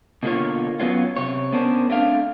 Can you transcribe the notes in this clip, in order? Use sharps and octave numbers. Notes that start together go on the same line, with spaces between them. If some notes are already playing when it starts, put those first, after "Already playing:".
B2 D3 A#3 C#4 F4 C#5
F#3 B3 C#4 F4
C3 C#5
B3 C#4 D4 A#4 C5
A3 C4 D4 F5